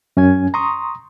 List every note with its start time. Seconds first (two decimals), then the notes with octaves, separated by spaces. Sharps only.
0.17 F#2 C#4 G#5 G#6
0.54 A#5 C6 C#6 D#6